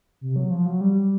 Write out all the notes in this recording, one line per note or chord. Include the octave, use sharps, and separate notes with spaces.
C3
F#3
F3
F#3
G3